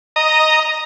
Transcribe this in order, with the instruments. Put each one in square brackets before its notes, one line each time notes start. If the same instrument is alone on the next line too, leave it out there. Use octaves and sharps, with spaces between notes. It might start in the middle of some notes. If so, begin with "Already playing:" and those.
[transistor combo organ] D#5 A#5